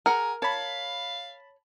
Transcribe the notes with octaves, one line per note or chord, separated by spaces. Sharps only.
G#4 A#4 F#5 A#5
C#5 F5 A5 B5